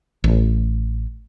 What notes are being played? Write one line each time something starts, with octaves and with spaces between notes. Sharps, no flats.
A1